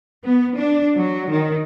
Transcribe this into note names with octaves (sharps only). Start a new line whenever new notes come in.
B3
D4
F#3
D#3